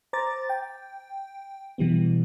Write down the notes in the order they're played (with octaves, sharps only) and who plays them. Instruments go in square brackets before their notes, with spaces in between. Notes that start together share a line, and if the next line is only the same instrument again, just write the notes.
[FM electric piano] C5 A#5 D6 A6
G5
B2 E3 G3 B3